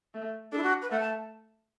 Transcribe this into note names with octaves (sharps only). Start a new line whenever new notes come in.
A3
D4 A4
E4
F#4
B4
A3 F#5
A5